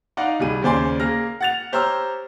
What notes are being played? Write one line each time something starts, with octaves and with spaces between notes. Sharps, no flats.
D#4 D5 D#5 F5 F#5
C2 G3 G#4 D#7
D#2 C#3 C5 D5 G#5 C6
A#3 G#4 F6 A#6
F#5 A6 F7
G4 C5 C#5 A#5 E6 F6